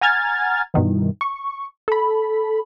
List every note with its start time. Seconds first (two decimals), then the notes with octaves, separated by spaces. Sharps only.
0.01 F#5 G#5 A#5 F6 G#6 A6
0.74 G2 B2 D#3 E3
1.21 C#6
1.88 A4 B5